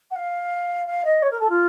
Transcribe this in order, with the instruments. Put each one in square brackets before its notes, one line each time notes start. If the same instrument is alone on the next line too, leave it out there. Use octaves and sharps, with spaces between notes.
[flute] F#5
F5
F5
D#5
C#5
A#4
A4
F4